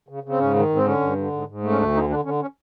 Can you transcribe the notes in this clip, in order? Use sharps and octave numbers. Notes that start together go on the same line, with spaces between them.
C#3
C#3
C4
G#2 C#4
D#3
G#2
C4
D3 C#4
G2
D3
G#2
G#2
A3
C#4
D2 D4
D3 D#4
D3 D4
D3 C#4
C#4